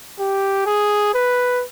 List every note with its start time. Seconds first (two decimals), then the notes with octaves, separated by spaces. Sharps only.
0.20 G4
0.66 G#4
1.14 B4